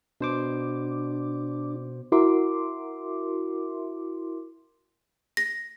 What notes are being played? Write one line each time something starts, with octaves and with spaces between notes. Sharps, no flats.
B2 D4 C5 D6
E4 F#4 A#4 E5 C6 D6
A#6